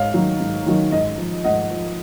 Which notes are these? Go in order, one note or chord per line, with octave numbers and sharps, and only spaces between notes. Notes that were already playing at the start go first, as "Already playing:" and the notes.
Already playing: G#2 C#5 F5
D#3 F#3
G#2
D#3 F#3
G#2 D#5
F3
G#2 D#5 F#5
F3